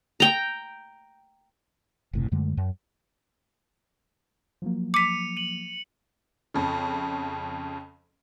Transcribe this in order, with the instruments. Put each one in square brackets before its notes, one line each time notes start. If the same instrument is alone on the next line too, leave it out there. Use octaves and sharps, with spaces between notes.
[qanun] G5 A#5
[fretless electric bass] F#1 A2 C3
F#2 D3 G#3 A3
F#2
[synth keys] F3 F#3 A#3
[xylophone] D6 B6 [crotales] C#7 D#7 F7
[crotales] D#7 F#7
[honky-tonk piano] F2 C#3